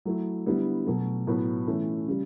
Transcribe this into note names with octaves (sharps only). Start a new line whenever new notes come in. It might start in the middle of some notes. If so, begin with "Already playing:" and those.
F#3 A3 E4
D3 G3 B3 E4
B2 F#3 A3
A2 F#3 B3
E3 A3 C#4 E4
C#3 G3